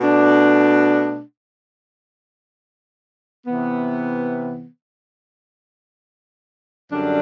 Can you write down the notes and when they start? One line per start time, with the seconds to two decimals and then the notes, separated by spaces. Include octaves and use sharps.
0.01 B2 A3 D4
3.46 C3 E3 B3
6.91 F#2 D3 G3 D4